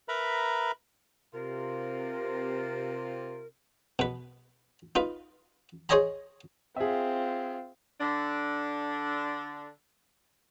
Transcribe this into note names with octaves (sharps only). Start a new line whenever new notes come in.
A#4 B4 E5 A#5 B5
C3 F4 A#4
B2 B4
D#4 F4 B4
G#4 C5 C#5 D#5 G#5 A#5
C4 F4 G#4 E5
D3 D4